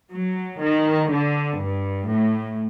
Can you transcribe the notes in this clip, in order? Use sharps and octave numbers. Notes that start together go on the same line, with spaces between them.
F#3
D#3
D3
G2
A2